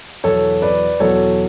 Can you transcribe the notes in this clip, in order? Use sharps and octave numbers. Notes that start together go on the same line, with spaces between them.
E2 B2 F#3 A4 C#5
B4 D5
E2 B2 F#3 A4 C#5